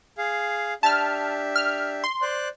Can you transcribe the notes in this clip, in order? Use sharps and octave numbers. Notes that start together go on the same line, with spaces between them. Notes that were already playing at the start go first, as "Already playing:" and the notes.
G#4 F5
D4 G4 E5 A5 F6
F6
C6
C5 D5 F#6